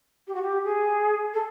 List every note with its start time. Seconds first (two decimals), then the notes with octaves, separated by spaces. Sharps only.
0.27 G4
0.35 F#4
0.42 G4
0.64 G#4
1.34 A4